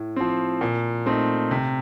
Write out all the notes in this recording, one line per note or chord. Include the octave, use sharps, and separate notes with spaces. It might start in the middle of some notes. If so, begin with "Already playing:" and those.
Already playing: A2
F3 C4
A#2
A3 C4 D#4
C3